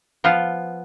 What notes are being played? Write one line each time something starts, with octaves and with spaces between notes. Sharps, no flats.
F3 B3 F4